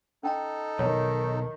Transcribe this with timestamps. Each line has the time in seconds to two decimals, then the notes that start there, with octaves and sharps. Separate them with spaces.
0.23 C#4 D#4 A4 G5 A#5
0.79 B1 D#3 C#5